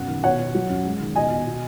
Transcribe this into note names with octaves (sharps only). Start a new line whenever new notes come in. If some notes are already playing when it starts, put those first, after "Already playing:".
Already playing: F#2 B2 F#5
D#3
B2 C#5 F#5
B2
F#3
F#2
G#3
D#3
B2 D#5 G#5
B2
B2